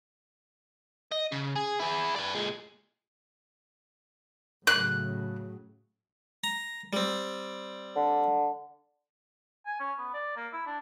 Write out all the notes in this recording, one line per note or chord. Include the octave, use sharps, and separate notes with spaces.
D#5
C#3
G#4
E4 G#4
B4 D5
A#2 G#3
A2 C#3 F#3 F#6
A#5
G3 C4
D3
G#5
C#4
B3
D5
A#3
E4
D4